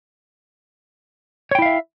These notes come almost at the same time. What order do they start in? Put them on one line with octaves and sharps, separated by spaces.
C#5 G5 E4 F5 E5